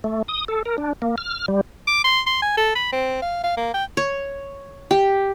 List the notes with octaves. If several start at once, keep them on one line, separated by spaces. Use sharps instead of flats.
A3
D#6
A4
A#4
D4
A#3
F6
G3
D6
C6
C6
G#5
A4
B5
C4
F5
F5
A#3
G5
C#5
G4